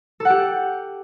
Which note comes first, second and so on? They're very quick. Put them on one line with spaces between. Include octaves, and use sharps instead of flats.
A4 F#5 G4